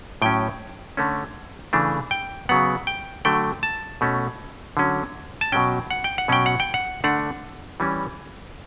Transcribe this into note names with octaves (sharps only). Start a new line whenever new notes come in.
A2 F#3 C#4 G5
D3 A3 C#4
C#3 E3 A3 D4
G5
C#3 F#3 B3 F#5
G5
D3 F#3 A3 G5
A5
B2 A3 C#4
D3 F#3 C#4
A5
B2 F#3 C#4 G5
F#5
G5
F#5
B2 F#3 C#4 G5
F#5
G5
F#5
D3 A3 D4 F#5
E3 G3 C#4